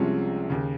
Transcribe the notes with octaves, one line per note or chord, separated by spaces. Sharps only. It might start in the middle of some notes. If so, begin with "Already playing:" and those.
Already playing: C2 C3 F3 G#3 C#4
D#2 C#3